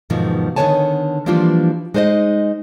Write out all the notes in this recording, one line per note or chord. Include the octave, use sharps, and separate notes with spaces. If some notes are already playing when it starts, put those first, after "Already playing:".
E2 G#2 B2 D#3 F3
D3 D#3 B3 C#5 G#5 A5
E3 F3 G3 A#3 D4 F4
G#3 D#4 C5 D5 D#5